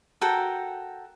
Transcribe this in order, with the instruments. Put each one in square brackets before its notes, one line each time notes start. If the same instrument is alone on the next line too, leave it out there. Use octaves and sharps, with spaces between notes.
[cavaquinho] F#4 A4 A#4 G5